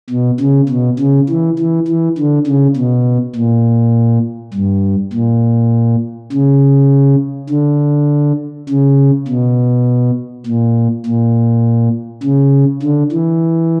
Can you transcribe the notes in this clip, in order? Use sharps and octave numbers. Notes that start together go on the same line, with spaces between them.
B2
C#3
B2
C#3
E3
E3
E3
D3
C#3
B2
A#2
G2
A#2
C#3
D3
C#3
B2
A#2
A#2
C#3
D3
E3